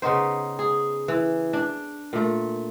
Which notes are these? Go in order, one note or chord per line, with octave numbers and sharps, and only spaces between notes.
C#3 B3 D#4 C5
G#4
E3
D4
A#2 A3